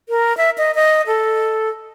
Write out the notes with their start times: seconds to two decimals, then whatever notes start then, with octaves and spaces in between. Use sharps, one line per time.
0.09 A#4
0.37 E5
0.58 D#5
0.75 D#5
1.07 A4